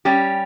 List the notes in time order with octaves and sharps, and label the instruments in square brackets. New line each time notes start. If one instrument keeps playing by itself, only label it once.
[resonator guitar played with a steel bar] G3 C#4 G4